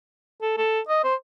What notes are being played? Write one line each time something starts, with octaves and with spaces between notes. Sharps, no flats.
A4
A4
D#5
C5